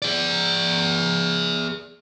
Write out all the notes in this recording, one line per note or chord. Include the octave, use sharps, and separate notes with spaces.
G#4 D5